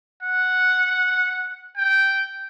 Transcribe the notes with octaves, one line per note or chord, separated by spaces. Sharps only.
F#5
G5